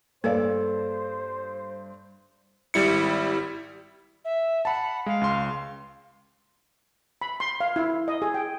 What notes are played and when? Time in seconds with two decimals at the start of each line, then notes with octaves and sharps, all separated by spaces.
0.24 G2 A#3 A4 B4 C5 D5 F5
2.74 G#1 G3 E4 C#7
4.25 E5
4.65 F#5 A5 B5
5.06 G#3 F5
5.21 C#2 C6
7.22 B5
7.40 C6
7.60 F5
7.76 E4
8.08 D#5
8.22 G#4
8.34 G5